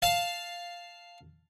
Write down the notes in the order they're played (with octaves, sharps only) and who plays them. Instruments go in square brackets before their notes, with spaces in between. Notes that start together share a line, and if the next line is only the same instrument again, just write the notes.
[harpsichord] F5 A5